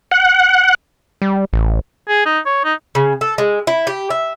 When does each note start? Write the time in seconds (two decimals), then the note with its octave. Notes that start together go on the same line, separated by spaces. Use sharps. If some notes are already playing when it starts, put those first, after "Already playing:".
0.11 F#5
1.22 G3
1.53 A1
2.09 G#4
2.25 D#4
2.46 C#5
2.64 D#4
2.95 C#3
3.21 A4
3.38 G#3
3.67 E4
3.87 G4
4.10 E5